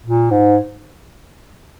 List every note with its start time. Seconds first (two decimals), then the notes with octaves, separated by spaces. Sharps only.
0.06 A#2
0.31 G#2